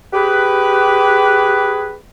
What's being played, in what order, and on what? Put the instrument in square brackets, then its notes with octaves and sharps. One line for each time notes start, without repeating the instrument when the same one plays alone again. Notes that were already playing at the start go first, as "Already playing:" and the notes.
[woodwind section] G4 G#4 B4